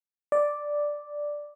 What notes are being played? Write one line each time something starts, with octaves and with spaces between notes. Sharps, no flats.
D5